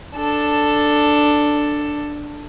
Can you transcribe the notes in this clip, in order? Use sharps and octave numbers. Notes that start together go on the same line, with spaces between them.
D4 A4